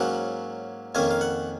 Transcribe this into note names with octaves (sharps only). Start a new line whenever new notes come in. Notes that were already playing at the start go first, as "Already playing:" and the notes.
Already playing: G#2 F#3 A#3 C#4 F#5
F2 D#3 A#3 C#4 G#5
F5
F#5